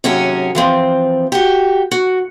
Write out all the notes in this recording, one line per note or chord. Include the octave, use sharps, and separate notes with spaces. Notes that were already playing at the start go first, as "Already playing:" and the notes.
D#2 C3 F#3 C#4 G#4 F#5
E3 F3 C4
F#4 G4
F#4